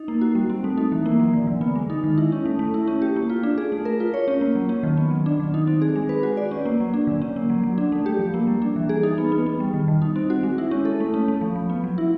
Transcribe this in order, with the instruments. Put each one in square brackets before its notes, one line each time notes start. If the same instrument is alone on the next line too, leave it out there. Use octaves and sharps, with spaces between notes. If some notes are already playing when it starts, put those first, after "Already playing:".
Already playing: [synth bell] D#4
A#3
F#4
G3
C4
A3
D#4
E3
A#3
F#3
D3
D3
B3
G#3
D#4
D#3
E4
C#4
A3
A3
E4
C#4
G4
A#3
F4
D4
G#4
A3
A#4
F4
C#5
C#4
A#3
F#3
C#4
D#3
B3
F#3
D4
D#3
D#4
C4
G#4
G#3
B4
F#4
D5
C#4
A#3
F#3
D4
D3
C#4
A#3
F#3
F#3
D4
A3
G4
F3
A#3
G3
D4
E3
G#4
D#4
B3
B3
B3
G3
D#3
D#3
D#4
C4
F#4
G#3
E4
C#4
A4
A3
C#4
A3
F3
F3
B3
F#3
E4